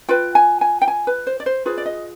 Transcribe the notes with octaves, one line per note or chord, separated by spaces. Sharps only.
F4 B4 G5
G#5
G#5
G5
G#5
B4
C5
D5
C5
F4 G#4 B4 C5
D5
D#5